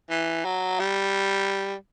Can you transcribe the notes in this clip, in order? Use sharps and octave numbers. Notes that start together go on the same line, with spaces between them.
E3
F#3
G3